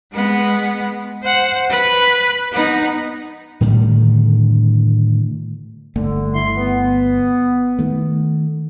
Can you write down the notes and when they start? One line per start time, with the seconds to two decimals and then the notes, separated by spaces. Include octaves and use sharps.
0.12 G#3 B3
1.22 C5 F#5
1.70 B4
2.52 B3 D#4
3.61 A2 D3 D#3 G3
5.96 G1 D3 A3
6.34 E4 C6
6.56 B3
7.79 D#3 A3